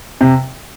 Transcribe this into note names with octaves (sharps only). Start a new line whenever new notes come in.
C3